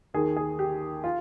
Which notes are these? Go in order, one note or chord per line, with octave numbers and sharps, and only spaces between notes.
D#2 D#3 G#4
G#4
G4
F4